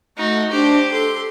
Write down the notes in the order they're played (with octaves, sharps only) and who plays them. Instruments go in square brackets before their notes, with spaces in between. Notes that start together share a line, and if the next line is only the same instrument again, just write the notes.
[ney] A3 [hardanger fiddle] D#4 F#4
[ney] D4 [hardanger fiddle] G4 C5
[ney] A4 [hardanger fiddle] C6